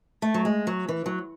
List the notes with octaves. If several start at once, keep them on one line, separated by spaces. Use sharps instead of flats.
A3
F#3
G#3
F#3
E3
F#3